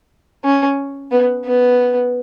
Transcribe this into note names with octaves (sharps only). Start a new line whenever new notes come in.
C#4
B3
B3